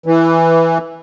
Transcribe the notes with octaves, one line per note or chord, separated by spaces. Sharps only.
E3